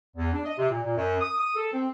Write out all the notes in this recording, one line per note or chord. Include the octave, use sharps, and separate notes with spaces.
E2
D4
D#5
C3
A#2
A#2
F#2
D#6
D#6
A4
C4